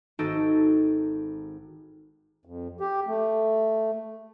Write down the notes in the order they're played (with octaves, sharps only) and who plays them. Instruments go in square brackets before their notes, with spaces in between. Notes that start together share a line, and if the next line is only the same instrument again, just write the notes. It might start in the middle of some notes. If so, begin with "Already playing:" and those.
[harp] G#1 D#4 F#4 A4 D7
[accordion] F2
G4
A3